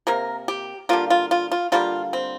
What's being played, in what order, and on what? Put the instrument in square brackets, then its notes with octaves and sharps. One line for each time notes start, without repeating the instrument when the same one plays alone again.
[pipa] C3 A#3 A#4
G4
D3 G3 A#3 F4
F4
F4
F4
D3 G3 A#3 F4
C4